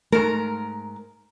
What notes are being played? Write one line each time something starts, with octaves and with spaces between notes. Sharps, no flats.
G#2 A3 A#4